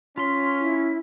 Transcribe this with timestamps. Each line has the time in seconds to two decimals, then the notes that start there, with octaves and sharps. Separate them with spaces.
0.18 C#4 F4 C6 B6
0.61 E4